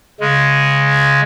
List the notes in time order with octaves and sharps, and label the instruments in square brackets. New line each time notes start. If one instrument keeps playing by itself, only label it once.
[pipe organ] C#3 G#3